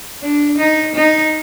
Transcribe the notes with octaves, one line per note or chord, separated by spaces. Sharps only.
D4
D#4
D#4